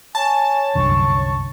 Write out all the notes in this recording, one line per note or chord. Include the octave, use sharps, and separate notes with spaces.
C#5 G#5 A5
C2 F#2 D3 C#6